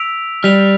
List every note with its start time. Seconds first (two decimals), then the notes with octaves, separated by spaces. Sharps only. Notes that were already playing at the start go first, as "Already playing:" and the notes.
Already playing: E6 B6 D7 F7
0.43 G3 F6 B6 D7 F7